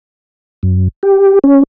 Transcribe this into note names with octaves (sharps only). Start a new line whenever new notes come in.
F#2
G4
C#4